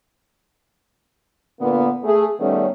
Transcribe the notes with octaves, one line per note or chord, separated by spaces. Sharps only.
A#2 D3 A#3 B3
A3 G#4
D#3 G3 A3 B3 C#4